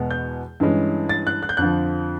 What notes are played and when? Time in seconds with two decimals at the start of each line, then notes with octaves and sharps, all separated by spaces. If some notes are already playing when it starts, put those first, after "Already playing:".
Already playing: E2 B2 G#3 B3
0.11 G6
0.60 G2 E3 G#3 C#4
1.09 A6
1.27 F#6
1.43 F#6
1.49 G6
1.57 F2 D3 F3 F#6